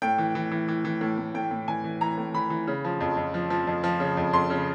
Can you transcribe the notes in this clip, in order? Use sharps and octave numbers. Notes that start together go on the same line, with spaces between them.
A2 G5
E3
E3
E3
E3
E3
A2
A2
A2 G5
A2
E3 G#5
E3
E3 A#5
A2
E3 B5
E3
C#3
F3
F2
F2
F3
F3
F2
F3
C#3
F2
F2 C6
C#3